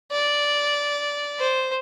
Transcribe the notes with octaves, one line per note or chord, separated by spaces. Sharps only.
D5
C5